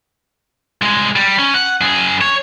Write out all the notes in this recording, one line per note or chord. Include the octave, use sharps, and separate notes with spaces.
C2 G#3
G3
C#4
F#5
F#2 G#4
C#5